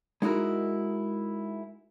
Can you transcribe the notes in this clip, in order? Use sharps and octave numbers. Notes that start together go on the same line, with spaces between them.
G#3 D#4 E4 F#4 A#4